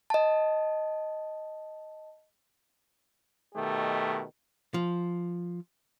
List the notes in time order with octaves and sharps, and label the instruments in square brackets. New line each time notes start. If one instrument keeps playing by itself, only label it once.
[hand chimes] D#5 A5
[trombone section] B2 D#3 A3 G4
[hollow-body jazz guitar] F3